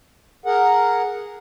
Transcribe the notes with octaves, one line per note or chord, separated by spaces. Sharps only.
G#4 A#4 F#5